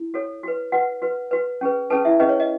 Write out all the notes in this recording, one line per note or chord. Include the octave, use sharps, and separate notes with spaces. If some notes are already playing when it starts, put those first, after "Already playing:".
Already playing: E4
F#4 A4 C#5
F#4 B4
F#4 B4 F#5
F#4 B4
F#4 B4
C#4 G#4 B4
C#4 G#4 A4 B4 A5
E4 E5
C#4 G#4 B4 D#5
C#5
D#5